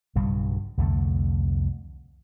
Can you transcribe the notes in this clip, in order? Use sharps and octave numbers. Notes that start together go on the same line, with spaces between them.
B1 G2 C#3 G3
C2 F2 D3 A3